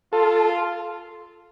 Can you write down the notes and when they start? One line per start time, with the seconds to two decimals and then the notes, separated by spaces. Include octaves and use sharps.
0.13 F4 A4